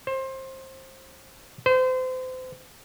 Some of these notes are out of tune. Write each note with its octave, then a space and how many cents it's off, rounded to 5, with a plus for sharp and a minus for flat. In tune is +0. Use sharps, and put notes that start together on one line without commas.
C5 +25
C5 -30